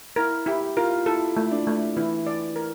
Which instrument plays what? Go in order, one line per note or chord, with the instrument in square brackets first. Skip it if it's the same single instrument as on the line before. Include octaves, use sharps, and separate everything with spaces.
[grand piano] E4 [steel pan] A#4
[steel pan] E4 [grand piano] G4
[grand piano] F4 [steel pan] A#4
[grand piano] E4 [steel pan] A4
[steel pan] A3
[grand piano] D4
[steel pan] A3
[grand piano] E3 [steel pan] E4
[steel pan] D5
A#4